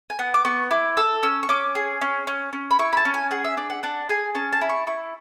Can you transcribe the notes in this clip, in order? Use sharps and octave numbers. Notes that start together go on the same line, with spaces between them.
G#5
B3 F#5
D6
B3 C#6
E4 D6
A4 E6
C#4 E6
C#6
C#4 D6
G#4
C#4
C#4
C#4
B5
E4 C#6
B5
A5
C#4
G#5
G#4 F#5
E5
D4 D5
F#5
D4 F#5
G#4 G#5
C#4 A5
A5
E4
C#6
E4 C#6